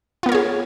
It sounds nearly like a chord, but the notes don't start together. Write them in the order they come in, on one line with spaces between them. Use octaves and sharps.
F4 B3 A#4 C#5 G#4